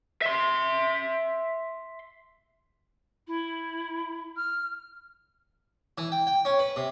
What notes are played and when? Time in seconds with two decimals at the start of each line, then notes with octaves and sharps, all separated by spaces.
0.22 E5 C6
3.27 E4
4.36 F6
5.98 E3
6.12 G5
6.27 G5
6.45 C#4
6.59 B4
6.76 C3